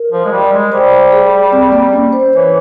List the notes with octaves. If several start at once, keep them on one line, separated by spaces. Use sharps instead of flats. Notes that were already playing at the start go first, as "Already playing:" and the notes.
Already playing: A#4
F3
G#3
G3
G#3
G3 C5
G#4
C4
A#3
C#4
C5
E3 C#5